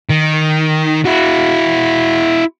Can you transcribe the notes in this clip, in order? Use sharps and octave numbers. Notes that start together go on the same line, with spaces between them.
D#3
E4 F#4